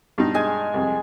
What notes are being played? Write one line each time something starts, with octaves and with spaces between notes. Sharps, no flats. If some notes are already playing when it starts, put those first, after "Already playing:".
G2 B2 D#4
G#3 G#5
C2 F2